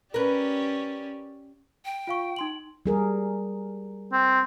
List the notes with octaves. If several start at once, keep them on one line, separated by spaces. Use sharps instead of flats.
C#4 G4 A#4 B4 D5
G5
F4 F5 C#6
D#4 C6 F#7
G3 G#4 A#4
C4